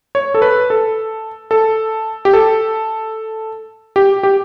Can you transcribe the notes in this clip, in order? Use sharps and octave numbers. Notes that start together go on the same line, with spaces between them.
C#5
A4
B4
A4
A4
G4
A4
G4
G4